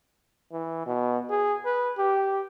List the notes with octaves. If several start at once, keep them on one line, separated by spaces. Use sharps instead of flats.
E3
B2
G#4
B4
G4